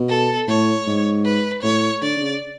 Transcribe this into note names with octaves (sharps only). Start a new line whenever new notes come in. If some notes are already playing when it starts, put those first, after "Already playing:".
Already playing: B2
A4
A2 C#5
G#2
B4
A2 C#5
D3 D5
D3
C#3